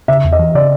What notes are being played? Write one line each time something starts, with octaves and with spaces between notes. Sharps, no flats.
C#3 E5
E2
D#5
E3
C#3 D5